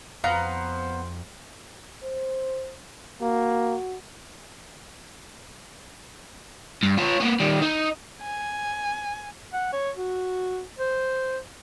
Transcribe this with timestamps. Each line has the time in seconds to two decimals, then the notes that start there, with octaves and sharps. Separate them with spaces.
0.24 F2 B3 C5 F5 A#5
2.03 C5
3.21 A#3 F#4
6.83 G2
6.98 F4 C#5
7.20 A#3 B3
7.40 D#3 G3
7.62 D#4
8.22 G#5
9.53 F#5
9.73 C#5
9.96 F#4
10.79 C5